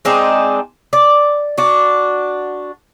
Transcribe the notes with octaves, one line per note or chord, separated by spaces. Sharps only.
G#3 C4 D4 D#4
D5
D4 F#4